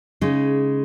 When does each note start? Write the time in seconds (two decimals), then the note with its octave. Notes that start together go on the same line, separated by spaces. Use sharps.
0.21 C#3 G#3 D#4